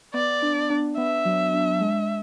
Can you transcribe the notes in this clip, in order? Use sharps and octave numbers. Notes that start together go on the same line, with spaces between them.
B3 D5
D4
D4
B3 E5
F#3
D4
G#3